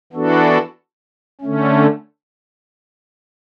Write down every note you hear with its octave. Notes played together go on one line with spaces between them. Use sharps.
E3 B3 D4 F#4 A4
D3 A3 C#4